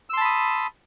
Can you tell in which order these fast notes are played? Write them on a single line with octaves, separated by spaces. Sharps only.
E6 C6 A5 B5 D#6